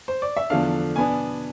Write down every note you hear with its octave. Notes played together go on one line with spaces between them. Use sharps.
C5
D5
E5
E2 D3 F3 A3 D4 F5
B2 B3 D4 G#5